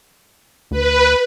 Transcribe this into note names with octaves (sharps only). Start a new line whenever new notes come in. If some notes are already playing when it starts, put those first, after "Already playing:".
D2 B4